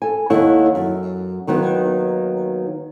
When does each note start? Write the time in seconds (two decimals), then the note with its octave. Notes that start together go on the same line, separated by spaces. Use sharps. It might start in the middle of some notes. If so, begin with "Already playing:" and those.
0.02 A4 G#5
0.30 D#2 E4 A4 C#5 F#5
0.75 F#2
1.47 D#2 D#3 F#3 B3